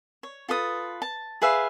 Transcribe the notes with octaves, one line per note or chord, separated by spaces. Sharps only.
C#5
F4 A4 B4 D#6
A5
G#4 B4 E5 F5